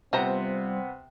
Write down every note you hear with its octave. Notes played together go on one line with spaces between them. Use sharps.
C3 G3 B3 C4 F4 C5 A#5